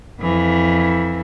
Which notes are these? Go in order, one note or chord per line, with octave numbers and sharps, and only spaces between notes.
F2 E3